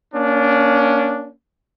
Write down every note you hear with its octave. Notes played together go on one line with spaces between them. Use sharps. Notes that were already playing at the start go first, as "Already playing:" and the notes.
A#3 C#4 D4